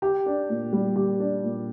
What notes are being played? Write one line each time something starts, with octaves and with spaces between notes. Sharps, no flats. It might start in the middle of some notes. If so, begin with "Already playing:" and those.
G4
D4
A#2
G3
G4
D4
A#2